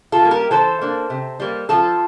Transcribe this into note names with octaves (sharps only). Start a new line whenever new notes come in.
F4 A4
G3 A#3
G4 A#4
E3 A4 C5
A#3 D4
C3
G3 A#3
F3 F4 A4